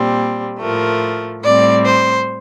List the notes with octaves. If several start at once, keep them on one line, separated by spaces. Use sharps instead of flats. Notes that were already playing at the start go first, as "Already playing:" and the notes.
Already playing: A#2 G3 C4
A2 F3 A3 A#4
A2 G3 C4 D5
C5